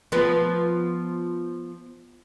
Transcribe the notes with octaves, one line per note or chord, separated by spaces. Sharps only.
F3 B3